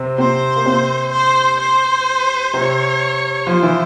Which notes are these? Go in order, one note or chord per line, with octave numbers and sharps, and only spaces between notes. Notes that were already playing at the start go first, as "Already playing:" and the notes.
Already playing: C3 C4
C3 C4 C5
A#3
C3 C4
C5
C5
C3 C4 C#5
F3 F4 C5
E3 E4